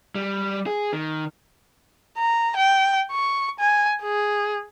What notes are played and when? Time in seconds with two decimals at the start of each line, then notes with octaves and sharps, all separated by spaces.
0.15 G3
0.67 G#4
0.93 D#3
2.18 A#5
2.56 G5
3.11 C#6
3.59 G#5
4.02 G#4